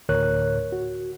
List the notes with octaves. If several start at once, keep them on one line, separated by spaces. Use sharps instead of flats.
D2 A2 D3 A#4 C#5 F#6
F#4